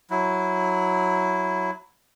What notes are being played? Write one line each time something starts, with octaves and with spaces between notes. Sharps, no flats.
F#3 E4